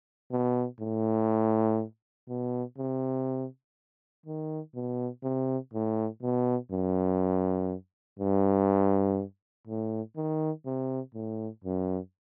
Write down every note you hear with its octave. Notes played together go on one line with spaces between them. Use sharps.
B2
A2
B2
C3
D#3
B2
C3
A2
B2
F#2
G2
A2
D#3
C3
A2
F#2